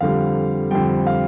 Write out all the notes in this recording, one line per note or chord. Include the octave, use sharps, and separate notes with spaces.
F2 D3 G3 F5
F2 D3 G3 G5
F5